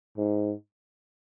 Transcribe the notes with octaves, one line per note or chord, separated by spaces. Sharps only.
G#2